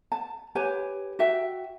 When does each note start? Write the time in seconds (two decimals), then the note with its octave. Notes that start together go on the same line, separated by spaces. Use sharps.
0.12 A5
0.55 G4 B4 C#5 G#5
1.19 F#4 E5 G5